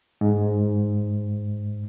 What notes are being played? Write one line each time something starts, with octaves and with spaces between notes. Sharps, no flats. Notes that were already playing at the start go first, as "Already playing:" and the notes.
G#2